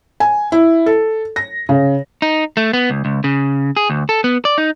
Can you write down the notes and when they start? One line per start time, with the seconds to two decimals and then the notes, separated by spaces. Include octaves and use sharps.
0.20 G#5
0.52 E4
0.86 A4
1.36 A#6
1.69 C#3
2.22 D#4
2.57 A3
2.73 B3
2.90 C#2
3.05 C#2
3.24 C#3
3.77 G#4
3.90 D2
4.09 A4
4.24 B3
4.45 D5
4.58 D#4